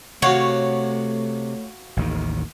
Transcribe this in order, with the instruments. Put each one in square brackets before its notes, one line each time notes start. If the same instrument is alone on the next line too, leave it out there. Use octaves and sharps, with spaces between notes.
[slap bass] C3 [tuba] A3 [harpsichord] F#4 F5 F#5 [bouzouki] C#5
[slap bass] A1 D#2 D#3